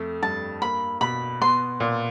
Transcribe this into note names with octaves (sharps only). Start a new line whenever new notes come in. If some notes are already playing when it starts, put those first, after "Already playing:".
Already playing: F2 A3
G2 A5
A#3 B5
B2 B5
B3 C6
A#2